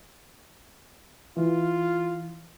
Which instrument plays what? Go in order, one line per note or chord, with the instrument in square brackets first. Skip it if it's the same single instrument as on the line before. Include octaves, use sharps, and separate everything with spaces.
[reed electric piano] E3 [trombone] F4